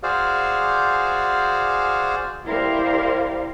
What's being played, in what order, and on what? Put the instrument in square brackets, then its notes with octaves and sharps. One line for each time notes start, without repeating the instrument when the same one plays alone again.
[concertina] F#4 G#4 C5 D5 F5
[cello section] E4 G4 A#4 C5 D5 F5